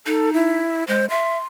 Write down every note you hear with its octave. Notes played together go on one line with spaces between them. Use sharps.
D#4 A4
E4
G#3 C5
E5 C6